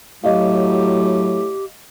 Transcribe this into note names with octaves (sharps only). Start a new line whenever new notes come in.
A2 F#3 G4 D#5 F5